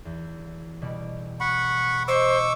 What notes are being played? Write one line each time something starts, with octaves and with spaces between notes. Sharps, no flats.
E2
B2 G3 D5
F#5 B5 C#6
C5 D#5 C#6 D6 E6